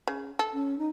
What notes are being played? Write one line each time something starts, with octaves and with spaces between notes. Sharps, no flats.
C#3
A4
C#4
D#4